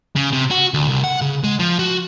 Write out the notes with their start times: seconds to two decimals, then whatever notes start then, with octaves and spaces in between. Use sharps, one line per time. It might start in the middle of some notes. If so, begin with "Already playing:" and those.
0.16 C#3
0.32 C3
0.51 F#4
0.74 D2
0.88 C2
1.04 F#5
1.22 C#3
1.44 G#3
1.59 F3
1.79 F#4